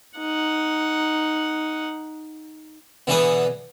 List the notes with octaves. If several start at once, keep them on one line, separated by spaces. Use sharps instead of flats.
D#4 F#5
B2 D3 E3 B3 G#4 B4